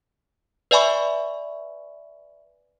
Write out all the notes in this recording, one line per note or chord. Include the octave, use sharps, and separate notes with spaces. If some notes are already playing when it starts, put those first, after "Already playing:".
B4 D5 E5 G#5 B5 C#6